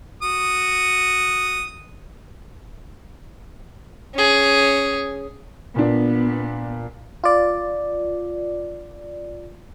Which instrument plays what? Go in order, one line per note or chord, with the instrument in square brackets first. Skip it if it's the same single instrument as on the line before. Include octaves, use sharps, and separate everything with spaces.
[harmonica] F#4 D#6
[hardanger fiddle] C#4 G#4
[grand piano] A#2 D4 [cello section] B3
[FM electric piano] F4 D5